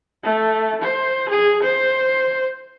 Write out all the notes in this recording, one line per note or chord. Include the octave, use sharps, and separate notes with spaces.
A3
C5
G#4
C5